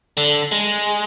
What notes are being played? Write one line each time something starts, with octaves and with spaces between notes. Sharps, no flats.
D3
G#3